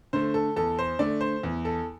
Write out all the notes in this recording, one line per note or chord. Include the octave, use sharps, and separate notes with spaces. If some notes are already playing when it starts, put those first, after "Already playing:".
D3 A3 C5
A4
E2 A4
C5
D3 A3 D5
C5
E2
A4